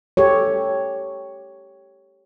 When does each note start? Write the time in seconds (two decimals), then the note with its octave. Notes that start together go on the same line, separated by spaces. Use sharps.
0.17 G4 A4 C#5